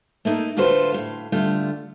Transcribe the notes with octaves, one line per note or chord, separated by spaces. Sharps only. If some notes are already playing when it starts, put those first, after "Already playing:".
A3 A#3 D#4 A4
D2 F4 F#4 A4 B4 C5
A2 F5
D3 G3 A3 F4